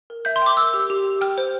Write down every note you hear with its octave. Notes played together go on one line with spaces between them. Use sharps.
A#4
E5 G6
C6
G5 D6
A#4 E6
G4
G4
G4
G5 F6
C5